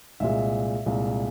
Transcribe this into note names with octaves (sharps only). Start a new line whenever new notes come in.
C2 A#2 G#3 E5
C2 A#2 G#3